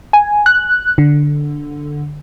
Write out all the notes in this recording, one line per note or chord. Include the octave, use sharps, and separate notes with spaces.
G#5
F#6
D3